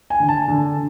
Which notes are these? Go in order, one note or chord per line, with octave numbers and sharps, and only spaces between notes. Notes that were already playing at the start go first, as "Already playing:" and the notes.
G#5
D3
A5
D3